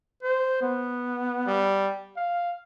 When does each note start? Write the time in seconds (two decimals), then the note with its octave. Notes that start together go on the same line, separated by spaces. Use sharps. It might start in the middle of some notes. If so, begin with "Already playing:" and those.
0.23 C5
0.62 B3
1.47 G3
2.17 F5